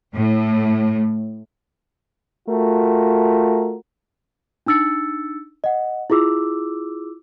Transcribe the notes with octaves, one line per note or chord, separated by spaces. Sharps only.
A2
A3 F4 F#4 A#4
D4 D#4 E6 A6 C#7
D#5 F#5
E4 F4 G#4 D6 E6